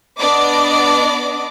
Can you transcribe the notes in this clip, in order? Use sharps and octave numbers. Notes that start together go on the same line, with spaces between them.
B3 D4 D5 D#5 D6